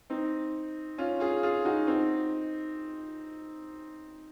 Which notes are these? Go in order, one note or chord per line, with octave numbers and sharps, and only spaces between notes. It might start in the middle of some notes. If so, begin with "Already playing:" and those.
C4 D#4
C#4 F4
F4 G#4
F4 G#4
D#4 F#4
C4 D#4